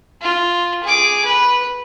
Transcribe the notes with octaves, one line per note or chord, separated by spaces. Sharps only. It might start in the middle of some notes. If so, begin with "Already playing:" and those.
F4
G#4 D6
B4